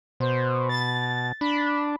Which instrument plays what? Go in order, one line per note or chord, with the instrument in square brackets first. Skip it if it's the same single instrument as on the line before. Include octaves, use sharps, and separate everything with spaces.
[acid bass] B2 [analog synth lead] C5
[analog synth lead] A6
[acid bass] D4 [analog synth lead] B5